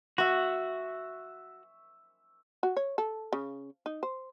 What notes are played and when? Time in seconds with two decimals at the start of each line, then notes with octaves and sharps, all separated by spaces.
0.18 F#4 E5 C#6
2.63 F#4
2.77 C#5
2.98 A4
3.33 C#3
3.86 D#4
4.03 C5